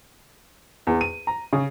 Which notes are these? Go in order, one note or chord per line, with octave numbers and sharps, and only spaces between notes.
E2
D#7
A#5
C#3